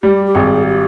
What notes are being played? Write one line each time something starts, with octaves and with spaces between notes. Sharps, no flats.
G3 G4
G4
G#1 G#4
G4